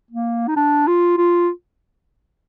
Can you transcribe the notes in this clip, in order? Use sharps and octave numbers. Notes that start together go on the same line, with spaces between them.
A#3
D#4
D4
F4
F4